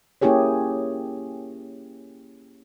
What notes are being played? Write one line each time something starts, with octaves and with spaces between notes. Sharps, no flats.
A#3 C#4 E4 G4 G#4 C#5